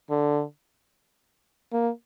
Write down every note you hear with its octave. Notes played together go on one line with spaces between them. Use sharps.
D3
A#3